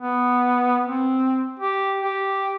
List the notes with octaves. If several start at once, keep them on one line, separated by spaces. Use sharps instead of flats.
B3
C4
G4
G4